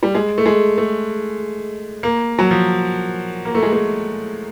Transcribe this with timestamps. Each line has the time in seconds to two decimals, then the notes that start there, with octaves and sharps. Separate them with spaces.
0.03 G3
0.15 G#3
0.38 A3
0.46 G#3
0.78 A3
2.03 A#3
2.39 F#3
2.51 F3
3.45 A#3
3.55 A3
3.62 G#3
3.72 A3